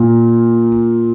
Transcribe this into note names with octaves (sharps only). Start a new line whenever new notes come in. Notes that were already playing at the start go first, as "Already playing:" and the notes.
Already playing: A#2